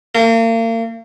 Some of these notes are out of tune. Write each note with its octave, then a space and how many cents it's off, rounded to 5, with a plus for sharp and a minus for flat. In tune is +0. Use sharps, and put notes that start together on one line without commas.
A#3 -40